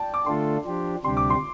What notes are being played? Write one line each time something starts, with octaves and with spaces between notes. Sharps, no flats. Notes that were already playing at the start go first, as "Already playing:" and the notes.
Already playing: D5 G5 A5
D6
D3 A3 D4 F4 A4 C6
F3 D4 G4
D2 C3 G3 D4 G4 C6
D6
C6